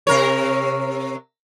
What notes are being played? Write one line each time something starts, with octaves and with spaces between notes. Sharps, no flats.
C3 A#4 C#5